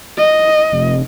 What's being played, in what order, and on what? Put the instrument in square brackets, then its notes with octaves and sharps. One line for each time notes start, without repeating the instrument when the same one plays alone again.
[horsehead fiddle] D#5
[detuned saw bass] F1